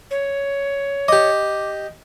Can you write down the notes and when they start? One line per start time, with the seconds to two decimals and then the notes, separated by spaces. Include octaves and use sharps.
0.11 C#5
1.08 G4 D#5 D6